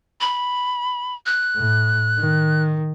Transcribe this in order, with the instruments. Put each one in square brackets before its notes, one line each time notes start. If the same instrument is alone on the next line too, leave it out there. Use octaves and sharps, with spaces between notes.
[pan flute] B5
F#6
[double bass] A2
D#3